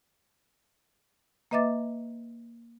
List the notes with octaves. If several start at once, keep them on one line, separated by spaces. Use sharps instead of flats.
A#3 B4 D#5 E5 D6 A6